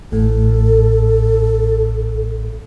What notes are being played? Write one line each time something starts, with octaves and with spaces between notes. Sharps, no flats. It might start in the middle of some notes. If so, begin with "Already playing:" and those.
A1 A2 A4